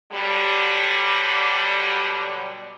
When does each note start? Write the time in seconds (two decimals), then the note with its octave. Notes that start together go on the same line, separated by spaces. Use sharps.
0.12 B2 D3 F#3 G3